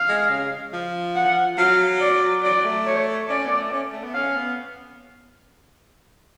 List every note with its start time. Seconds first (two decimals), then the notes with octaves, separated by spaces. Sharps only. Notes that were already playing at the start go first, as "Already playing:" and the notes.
Already playing: F5
0.08 G#3
0.30 C#3
0.73 F3
1.15 F#5
1.58 F#3 F5
2.00 D5
2.43 F#3 D5
2.64 A3
2.86 C#5
3.29 C#4 D5
3.46 B3
3.51 A3
3.71 C#4
3.92 A3
4.04 B3
4.14 C#4 F5
4.35 B3